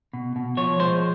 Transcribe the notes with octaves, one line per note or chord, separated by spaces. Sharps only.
B2
B2
F3 C#5
G#3 C5